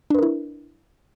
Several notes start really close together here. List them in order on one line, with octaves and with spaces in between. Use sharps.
D4 B4 A#4 E4